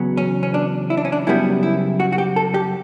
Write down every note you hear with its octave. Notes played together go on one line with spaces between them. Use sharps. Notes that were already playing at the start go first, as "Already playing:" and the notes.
Already playing: E2 C#3 F#3 B3
C#4
C#4
D4
E4
D4
C#4
D4
F#2 C#3 G3 B3 E4
E4
F#4
F#4
G4
A4
G4